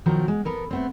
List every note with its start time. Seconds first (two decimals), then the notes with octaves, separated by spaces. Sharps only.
0.06 B2 D#3 F3 F#3 A#4 A#5
0.28 G#3
0.45 B3 A4 A#4
0.71 A3 B3 C4